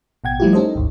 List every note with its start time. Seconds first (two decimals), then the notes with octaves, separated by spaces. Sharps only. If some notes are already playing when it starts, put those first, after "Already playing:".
0.24 A1 B2 F#5 G5 G#6
0.40 F3 G3 A3 E4 F4 G4
0.53 C#4 D#4 A4 C5 D#5
0.75 G#1 D2